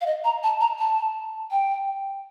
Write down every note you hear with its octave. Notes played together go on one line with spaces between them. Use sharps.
F5
D#5
A#5
A5
A#5
A5
G5